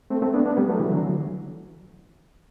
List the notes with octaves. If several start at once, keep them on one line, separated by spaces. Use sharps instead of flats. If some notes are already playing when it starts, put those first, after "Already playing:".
A3 C4
A3 C4
B3 D4
B3 D4
G3 B3
F#3 A3
E3 G3
D3 F#3
E3